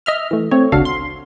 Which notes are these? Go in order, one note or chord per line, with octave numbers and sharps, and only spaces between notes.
D#5 E5 F6
E3 A3
A3 C4 C#5
G#1 C#2 D4 F#4 A4 F5
C6